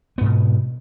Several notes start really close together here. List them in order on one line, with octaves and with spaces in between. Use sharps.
B3 G#2 B2